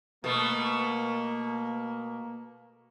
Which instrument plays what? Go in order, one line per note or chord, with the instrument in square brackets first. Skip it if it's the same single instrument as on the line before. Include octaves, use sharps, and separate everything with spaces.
[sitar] B2 A3 [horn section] A#3